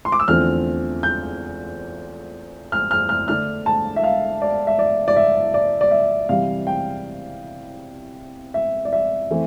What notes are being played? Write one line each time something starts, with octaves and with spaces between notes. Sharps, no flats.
C6
D6
E6
E2 D3 F3 A3 C4 F6
G6
F6
F6
F6
D3 A3 D4 F6
A5
E5
F5
D5
E5
D5
D5
E5
D5
D5
E5
C3 E3 G3 F5
G5
E5
D5
E5
E3 A3 C4